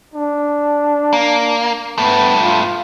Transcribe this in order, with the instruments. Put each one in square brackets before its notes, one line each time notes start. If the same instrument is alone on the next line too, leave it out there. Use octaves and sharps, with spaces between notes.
[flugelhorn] D4
[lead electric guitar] A#3
[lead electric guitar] G2 A3 [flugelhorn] B3
[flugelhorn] F4